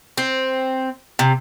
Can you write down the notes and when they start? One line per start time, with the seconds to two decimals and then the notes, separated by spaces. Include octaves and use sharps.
0.18 C4
1.19 C3